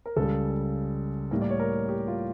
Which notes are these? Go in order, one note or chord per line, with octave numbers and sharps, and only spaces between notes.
A#4
C#2 C#3 G3 A4
A2 G3 A#3 A#4
D5
C#5
A#4
G4
F4